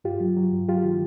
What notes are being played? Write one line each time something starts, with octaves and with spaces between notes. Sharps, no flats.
G2 F4 G4
F#3
F#3
G2
F#3 F4 G4
D#3